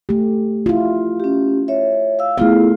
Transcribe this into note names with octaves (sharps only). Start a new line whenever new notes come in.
A3 G4
E4 F4
C#4 G4
C#5 E5
F5 E6
A3 B3 E4 F4 G#4 F5